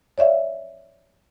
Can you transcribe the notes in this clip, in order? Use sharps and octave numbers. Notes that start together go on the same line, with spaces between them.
C#5 D5 E5 F5